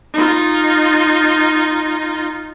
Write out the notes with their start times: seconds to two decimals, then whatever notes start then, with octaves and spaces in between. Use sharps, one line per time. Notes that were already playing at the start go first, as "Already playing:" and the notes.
0.13 D#4 F4